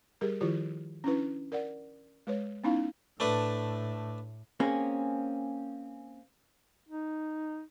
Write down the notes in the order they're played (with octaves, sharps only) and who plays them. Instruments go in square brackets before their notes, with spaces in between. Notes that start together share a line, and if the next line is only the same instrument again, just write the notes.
[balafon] G3 G4 G#4 A#4
D#3 F3 E4 F4 G4
C#4 D4 E4 B4
A#4 D5 F#5
G#3 B4 C#5
B3 C#4 D#4 E4 F5
[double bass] A2 [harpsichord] A3 D4 B4
[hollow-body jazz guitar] A#3 C4 C#4 G#4
[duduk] D#4